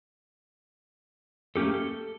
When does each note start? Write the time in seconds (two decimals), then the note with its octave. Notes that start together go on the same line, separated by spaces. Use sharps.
1.56 A3 A#3 C#4 G4 A4
1.74 A4